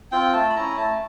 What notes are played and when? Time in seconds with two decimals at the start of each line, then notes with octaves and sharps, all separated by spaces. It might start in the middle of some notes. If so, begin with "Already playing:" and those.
0.12 C4 F4 G5
0.34 A3 A5
0.50 B5
0.56 C#4 E4 A#5
0.77 A3 A5